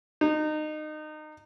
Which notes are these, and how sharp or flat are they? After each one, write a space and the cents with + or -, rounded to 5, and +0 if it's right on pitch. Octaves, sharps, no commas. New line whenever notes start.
D#4 -25